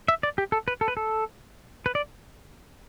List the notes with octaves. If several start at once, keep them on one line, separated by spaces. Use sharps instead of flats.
E5
D5
G4
A4
B4
A4
B4
A4
B4
D5